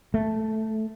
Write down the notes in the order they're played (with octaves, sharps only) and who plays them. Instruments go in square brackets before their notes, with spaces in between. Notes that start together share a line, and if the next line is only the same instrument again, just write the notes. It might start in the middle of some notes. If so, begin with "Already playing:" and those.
[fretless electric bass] A3